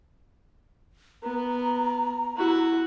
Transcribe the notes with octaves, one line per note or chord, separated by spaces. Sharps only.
B3 A#5
E4 F#4